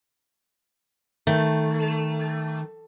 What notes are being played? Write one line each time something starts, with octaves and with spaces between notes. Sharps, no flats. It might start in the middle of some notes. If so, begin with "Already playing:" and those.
D#3 A3